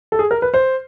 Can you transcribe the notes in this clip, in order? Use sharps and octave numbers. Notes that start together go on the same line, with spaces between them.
A4
G#4
A#4
B4
C5